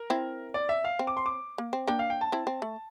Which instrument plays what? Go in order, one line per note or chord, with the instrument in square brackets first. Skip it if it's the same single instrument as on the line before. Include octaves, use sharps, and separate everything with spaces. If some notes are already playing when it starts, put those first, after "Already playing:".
Already playing: [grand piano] A#4
[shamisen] C4 E4
[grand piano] D5
E5
F5
[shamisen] C4
[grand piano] D6
C6
D6
[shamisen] A#3
C4
[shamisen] A#3 D4 [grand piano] G5
[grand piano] F5
G5
A5
[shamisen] C4 E4
C4
A3